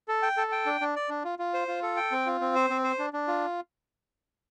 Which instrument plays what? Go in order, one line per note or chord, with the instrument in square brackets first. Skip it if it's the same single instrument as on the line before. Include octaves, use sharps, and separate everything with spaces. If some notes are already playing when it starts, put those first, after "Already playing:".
[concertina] A4
G5
A4
G5
D4
D4
D5
D4
F4
F4
C5
F4
A4
G5
C4
F4
C4
C5
C4
C5
D4
D4
F4